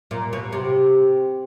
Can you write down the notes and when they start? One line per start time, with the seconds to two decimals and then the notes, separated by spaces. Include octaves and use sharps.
0.11 A#2
0.33 B2
0.52 C3